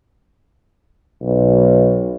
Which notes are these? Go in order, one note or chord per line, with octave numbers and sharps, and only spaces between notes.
B1